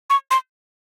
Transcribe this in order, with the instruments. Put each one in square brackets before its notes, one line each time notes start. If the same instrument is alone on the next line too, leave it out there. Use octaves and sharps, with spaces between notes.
[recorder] C#6
C6